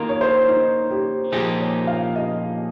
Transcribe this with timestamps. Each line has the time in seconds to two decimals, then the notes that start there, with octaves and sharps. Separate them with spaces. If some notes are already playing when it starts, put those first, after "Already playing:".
Already playing: D#3 A#3 F4 A#4
0.09 C#5
0.21 C5
0.49 D#4
0.90 G4
1.32 A#2 F3 A#3 D#4 G4 G#4
1.61 C#5
1.87 F5
2.16 D#5